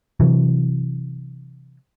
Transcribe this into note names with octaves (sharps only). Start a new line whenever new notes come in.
C3 E3 F#3